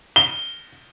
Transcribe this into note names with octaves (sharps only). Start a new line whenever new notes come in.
G7